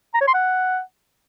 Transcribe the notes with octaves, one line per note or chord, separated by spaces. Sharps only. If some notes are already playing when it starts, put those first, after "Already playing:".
A#5
C#5
C6
F#5